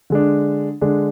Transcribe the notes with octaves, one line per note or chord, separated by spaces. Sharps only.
D3 G#3 D4
D3 G#3 D4